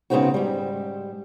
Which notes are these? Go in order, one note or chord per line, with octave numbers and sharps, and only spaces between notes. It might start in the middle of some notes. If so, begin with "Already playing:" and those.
G#2 C#3 B3 C4 D#4 F#4
G#2 G3